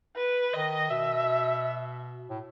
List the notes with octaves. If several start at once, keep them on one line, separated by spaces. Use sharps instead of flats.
B4
D#3 D#5
B2 E5
A2